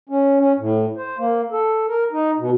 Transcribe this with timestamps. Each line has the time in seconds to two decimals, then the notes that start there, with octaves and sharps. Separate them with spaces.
0.09 C#4
0.40 C#4
0.59 A2
0.97 C5
1.18 A#3
1.51 A4
1.88 A#4
2.12 D#4
2.39 B2